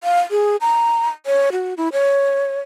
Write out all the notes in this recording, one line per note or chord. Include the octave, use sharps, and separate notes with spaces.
F5
G#4
A#5
C#5
F#4
E4
C#5